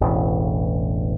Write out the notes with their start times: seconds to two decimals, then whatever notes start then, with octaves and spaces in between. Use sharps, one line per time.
0.01 E1 A1